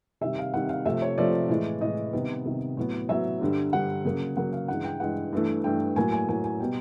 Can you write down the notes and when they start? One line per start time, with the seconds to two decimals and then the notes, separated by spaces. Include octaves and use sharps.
0.21 C3 D#3 G3 E5
0.38 F5
0.54 C3 D#3 G3 F#5
0.69 F5
0.86 C3 F3 A3 E5
1.02 C#5
1.18 C3 F3 A3 D5
1.49 A2 E3 G#3
1.81 A2 E3 G#3 D#5
2.13 C3 D#3 G3 B3
2.45 C3 D#3 G3 B3
2.77 A2 F#3 B3
3.09 A2 F#3 B3 E5
3.41 G2 D3 G3
3.73 G2 D3 G3 F#5
4.05 C#3 F#3 A#3
4.37 C#3 F#3 A#3 F#5
4.53 F5
4.68 G2 E3 G#3 F#5
4.84 G5
5.00 G2 E3 G#3 F#5
5.33 G2 E3 A3
5.64 G2 E3 A3 G5
5.96 A2 F#3 A#3 G#5
6.12 G#5
6.28 A2 F#3 A#3 G#5
6.44 G#5
6.60 B2 G3 B3 G5